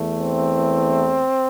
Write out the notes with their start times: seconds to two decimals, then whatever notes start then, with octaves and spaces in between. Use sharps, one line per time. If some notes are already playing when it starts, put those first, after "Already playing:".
Already playing: E2 E3 A3
0.17 C4